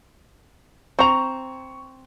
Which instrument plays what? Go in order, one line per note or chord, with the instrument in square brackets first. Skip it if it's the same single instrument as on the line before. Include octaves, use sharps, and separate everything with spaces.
[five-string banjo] C4 A#5 [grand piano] C#6 F7